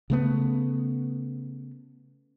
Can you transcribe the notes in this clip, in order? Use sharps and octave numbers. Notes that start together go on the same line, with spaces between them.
C#3 A3 B3